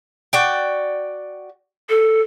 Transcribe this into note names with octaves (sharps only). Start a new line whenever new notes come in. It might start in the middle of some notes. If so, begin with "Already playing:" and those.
F#4 D5 G5
A4